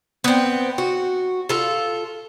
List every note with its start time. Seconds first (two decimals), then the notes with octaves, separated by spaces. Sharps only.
0.24 B3 C4
0.78 F#4
1.49 F4 A4